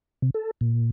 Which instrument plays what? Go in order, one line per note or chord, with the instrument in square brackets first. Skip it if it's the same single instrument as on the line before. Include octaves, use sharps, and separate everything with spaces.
[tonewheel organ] C3
A4
A#2